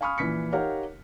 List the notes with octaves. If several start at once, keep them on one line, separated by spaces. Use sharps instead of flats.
F5 G#5 B5 C#6 D#6 F6
A#1 E3 B6 C#7
D#4 G4 A#4 C#5 F5 F#5